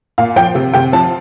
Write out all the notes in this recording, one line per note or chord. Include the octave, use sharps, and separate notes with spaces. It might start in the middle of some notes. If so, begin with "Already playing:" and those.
A#2 F5
F3 G5
C3
C3 G5
F3 A5